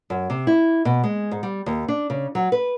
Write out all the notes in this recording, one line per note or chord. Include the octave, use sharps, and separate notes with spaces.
F#2
C3
E4
B2
G#3
G#2
G3
D#2
D4
C#3
F#3
B4